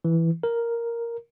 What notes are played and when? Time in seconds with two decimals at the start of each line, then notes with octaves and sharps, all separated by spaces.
0.05 E3
0.43 A#4